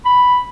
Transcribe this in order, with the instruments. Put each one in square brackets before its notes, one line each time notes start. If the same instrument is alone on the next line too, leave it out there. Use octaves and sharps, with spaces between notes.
[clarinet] B5